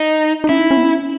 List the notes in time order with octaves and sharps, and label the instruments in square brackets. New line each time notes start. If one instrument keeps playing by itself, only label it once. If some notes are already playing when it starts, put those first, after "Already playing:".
Already playing: [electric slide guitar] D#4
[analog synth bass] D#4
[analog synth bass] C#4 [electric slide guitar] E4
[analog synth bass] D#4
C#4
B3
C#4